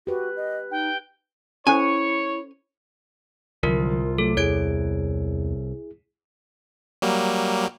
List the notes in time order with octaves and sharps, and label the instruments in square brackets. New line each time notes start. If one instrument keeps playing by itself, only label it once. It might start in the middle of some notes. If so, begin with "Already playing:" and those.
[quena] F#4 [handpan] G4 B4
[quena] D#5
[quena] D#4 [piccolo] G5
[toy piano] C#4 A4 C5 [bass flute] E4 [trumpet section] C#5 C#6 [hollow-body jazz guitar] G#5
[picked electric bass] C2 [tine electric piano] D3 F3 F#3 [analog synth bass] F4 [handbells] A#4
[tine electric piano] F#3 G3 A3 [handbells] A4
[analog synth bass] E2 [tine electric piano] E4 G#4 [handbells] C#5 G#6 D7
[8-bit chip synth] F#3 G3 A#3